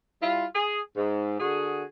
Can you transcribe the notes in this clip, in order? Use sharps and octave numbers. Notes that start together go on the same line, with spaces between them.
G3 E4 F4
G#4
G#2
D3 F#4 G#4